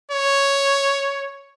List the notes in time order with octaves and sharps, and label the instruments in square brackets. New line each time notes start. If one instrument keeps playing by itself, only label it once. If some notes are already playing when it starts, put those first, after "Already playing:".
[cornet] C#5